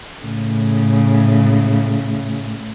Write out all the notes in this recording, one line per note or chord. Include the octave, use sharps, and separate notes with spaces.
A2 C#3